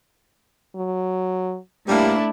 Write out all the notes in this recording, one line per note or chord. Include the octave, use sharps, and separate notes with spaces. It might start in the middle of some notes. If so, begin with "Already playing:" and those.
F#3
A2 G3 A3 A#3 D4 E4